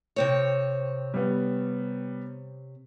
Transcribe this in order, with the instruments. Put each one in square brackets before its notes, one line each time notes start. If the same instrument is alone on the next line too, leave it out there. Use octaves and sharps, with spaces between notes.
[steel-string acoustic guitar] C3 C4 C#5
[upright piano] G3 B3